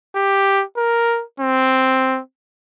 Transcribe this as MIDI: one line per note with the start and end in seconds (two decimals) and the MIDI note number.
0.16 0.64 67
0.77 1.23 70
1.40 2.20 60